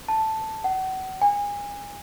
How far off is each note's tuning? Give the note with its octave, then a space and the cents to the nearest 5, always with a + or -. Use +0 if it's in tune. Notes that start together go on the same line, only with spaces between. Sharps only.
A5 +0
F#5 +35
G#5 -30